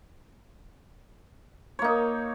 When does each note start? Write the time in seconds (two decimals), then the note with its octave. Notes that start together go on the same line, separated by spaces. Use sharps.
1.79 C#5
1.82 A#3
1.84 D#4